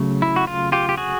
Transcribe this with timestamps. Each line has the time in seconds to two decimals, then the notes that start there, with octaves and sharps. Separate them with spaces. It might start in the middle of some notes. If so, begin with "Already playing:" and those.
Already playing: C#3 F#3 A3
0.22 E4
0.36 F#4
0.47 F4
0.72 F4 G4
0.89 G4
0.97 F#4 G#4